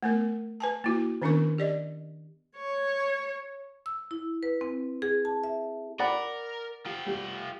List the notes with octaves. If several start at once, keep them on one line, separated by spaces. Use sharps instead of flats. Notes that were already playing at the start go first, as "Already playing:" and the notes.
A3 B3 A#4
B4 G#5 A5
A#3 E4 F#4
D#3 B3 C#4 D4 A#4 C#6
G4 D5 D#5
C#5
E6
E4
B4
C4
G#4
A5
E5
A#4 D5 F#5 B5
F4 G4
G3